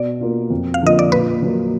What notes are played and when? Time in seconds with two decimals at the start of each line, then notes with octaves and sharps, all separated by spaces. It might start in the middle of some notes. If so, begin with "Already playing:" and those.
Already playing: B2 D5
0.21 A#3 F4
0.50 F2
0.74 F5
0.82 D3 F3 A#3 F4 D#5
0.99 D5
1.12 A#2 B4
1.42 F#3 A#3